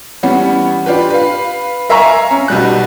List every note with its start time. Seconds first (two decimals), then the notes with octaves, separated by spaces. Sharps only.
0.23 E3 G3 B3 C#4
0.86 D4 F4 G4 B4
1.10 B4 F5
1.89 A#4 E5 F5 G#5 A#5 C#6
2.31 C#4
2.48 B1 B2 G3 F#6